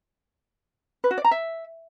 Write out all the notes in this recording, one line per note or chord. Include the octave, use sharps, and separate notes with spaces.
B4
F#4
D5
A#5
E5